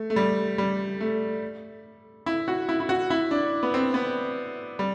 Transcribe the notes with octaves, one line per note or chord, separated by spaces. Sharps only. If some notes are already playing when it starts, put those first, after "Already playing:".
Already playing: A3
A3
G3
G3
A3
E4
F#4
E4
E4
F#4
E4
D4
B3
C4
B3
G3